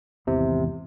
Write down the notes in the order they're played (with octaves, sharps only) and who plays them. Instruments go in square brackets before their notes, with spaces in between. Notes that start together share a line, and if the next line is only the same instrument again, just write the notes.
[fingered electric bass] G#1 E2 E3 [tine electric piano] C3